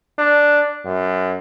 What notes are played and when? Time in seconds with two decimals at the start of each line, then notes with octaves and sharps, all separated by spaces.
0.19 D4
0.85 F#2